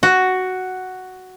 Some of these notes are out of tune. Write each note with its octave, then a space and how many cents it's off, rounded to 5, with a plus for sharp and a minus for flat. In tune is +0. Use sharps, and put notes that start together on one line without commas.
F#4 +5